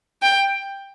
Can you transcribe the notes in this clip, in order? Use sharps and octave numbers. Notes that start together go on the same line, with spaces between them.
G5